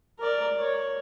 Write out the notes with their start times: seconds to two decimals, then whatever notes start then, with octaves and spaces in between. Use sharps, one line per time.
0.19 A#4 D5
0.59 C#5